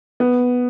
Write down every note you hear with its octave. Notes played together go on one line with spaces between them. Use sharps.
B3